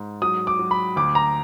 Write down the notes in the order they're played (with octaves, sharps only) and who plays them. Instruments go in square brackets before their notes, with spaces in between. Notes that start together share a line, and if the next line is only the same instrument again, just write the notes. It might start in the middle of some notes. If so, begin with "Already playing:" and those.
Already playing: [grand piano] G#2
F#3 D#6
D6
F#3
B5
D2 D6
A#5